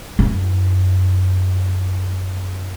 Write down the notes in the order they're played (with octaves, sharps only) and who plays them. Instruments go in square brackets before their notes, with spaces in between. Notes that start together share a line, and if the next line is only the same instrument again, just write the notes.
[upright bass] F#2 E4